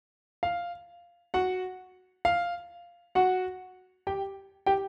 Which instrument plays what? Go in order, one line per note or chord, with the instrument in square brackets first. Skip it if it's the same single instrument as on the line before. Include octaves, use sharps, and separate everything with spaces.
[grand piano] F5
F#4 F#5
F5
F#4 F#5
G4 G5
G4 G5